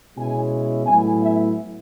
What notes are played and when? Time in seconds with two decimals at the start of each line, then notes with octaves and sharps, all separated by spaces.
0.17 B2 G#3 C#4 E4 G#5
0.86 A2 F#3 B3 E4 G#5
1.22 E5